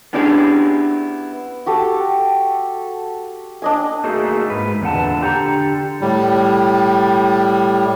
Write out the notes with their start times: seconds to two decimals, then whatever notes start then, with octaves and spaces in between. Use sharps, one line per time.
0.13 B3 C#4 D4 E4 G4 G#4
1.66 F#4 G4 A4
3.62 D4 D#5 G#5
4.04 A3 A#3 D#4 F#4 G#4
4.50 G#2 B4
4.82 E2 A#2 D3 F#5 A5
5.21 D3 G4 A4 A#5
6.01 A2 G3